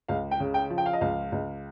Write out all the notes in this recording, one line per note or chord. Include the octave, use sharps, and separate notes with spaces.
C#2 F5
G5
C#3
G5
F3
G5
F5
D#5
C#2 F5
C#2